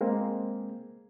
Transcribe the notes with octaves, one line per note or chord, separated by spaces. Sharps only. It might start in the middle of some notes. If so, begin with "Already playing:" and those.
G#3 A#3 C4